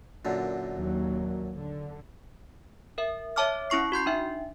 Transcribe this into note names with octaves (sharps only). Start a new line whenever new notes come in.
F#2 A#2 D3
D#2 F#3 A#3
D3
A#4 E5
C#5 E5 A5 D6 F6
C#4 E4 C#6 C7
F#4 C6 G6 C7
D4 D#4 E5